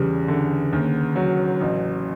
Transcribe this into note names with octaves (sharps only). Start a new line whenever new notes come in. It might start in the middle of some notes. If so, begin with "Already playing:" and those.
Already playing: E2 C#3 G3
D3
D#2
F#3
A1